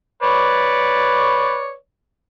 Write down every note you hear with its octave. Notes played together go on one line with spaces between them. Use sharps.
B4 C#5 D5